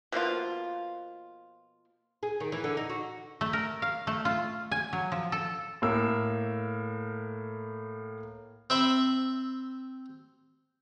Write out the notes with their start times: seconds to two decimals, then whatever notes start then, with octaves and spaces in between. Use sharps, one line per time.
0.12 B2 F3 A#3 F4
2.23 G#4
2.40 D#3
2.52 E3
2.64 D3
2.77 D#4
2.89 F#4
3.41 A3
3.53 A#4
3.82 F5
4.07 A3
4.25 F4
4.71 G#5
4.93 F#3
5.12 F3
5.32 A4
5.82 A2 A#3 A#4 E6
8.70 C4 E5 B5